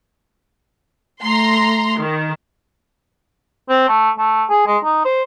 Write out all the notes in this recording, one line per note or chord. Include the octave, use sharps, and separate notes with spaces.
A3 A#5 C6
D#3
C4
A3
A3
G#4
G#3
D#4
C5